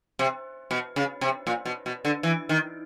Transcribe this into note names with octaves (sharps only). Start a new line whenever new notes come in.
C3
B2
C#3
C3
A#2
B2
B2
D3
E3
D#3